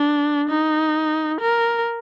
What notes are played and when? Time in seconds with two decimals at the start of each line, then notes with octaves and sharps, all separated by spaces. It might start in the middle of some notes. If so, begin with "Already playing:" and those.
Already playing: D4
0.50 D#4
1.41 A#4